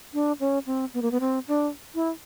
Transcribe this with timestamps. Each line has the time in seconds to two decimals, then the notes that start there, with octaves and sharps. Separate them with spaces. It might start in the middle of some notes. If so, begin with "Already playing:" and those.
0.13 D4
0.40 C#4
0.66 C4
0.94 B3
1.02 A#3
1.11 B3
1.20 C4
1.48 D4
1.95 E4